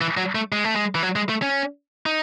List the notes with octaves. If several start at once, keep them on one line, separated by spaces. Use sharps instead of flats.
E3
F#3
A3
G#3
A3
G#3
E3
F#3
G#3
A3
C#4
D#4